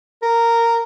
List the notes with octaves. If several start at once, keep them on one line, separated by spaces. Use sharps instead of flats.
A#4